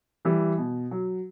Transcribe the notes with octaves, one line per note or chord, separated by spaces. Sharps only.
E3 G3
B2
F#3